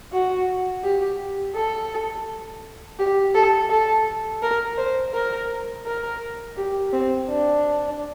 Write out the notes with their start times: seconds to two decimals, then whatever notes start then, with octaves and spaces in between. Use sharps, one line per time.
0.13 F#4
0.84 G4
1.55 A4
2.99 G4
3.35 A4
3.70 A4
4.43 A#4
4.78 C5
5.13 A#4
5.85 A#4
6.57 G4
6.93 C4
7.29 D4